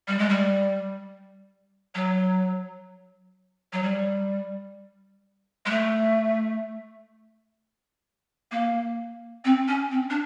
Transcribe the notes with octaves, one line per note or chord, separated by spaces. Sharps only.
G3
G#3
G3
F#3
F#3
G3
G#3
A3
A#3
C4
C#4
C4
D4